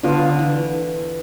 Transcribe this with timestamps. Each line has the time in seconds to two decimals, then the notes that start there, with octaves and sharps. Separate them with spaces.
0.03 D3 B3 D4 F4
0.39 E3